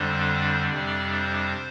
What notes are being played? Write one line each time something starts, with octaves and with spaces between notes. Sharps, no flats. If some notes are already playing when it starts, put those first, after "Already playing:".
Already playing: F2 D3 G3 D4 C5
F2 C3 G3 D4 D5
C5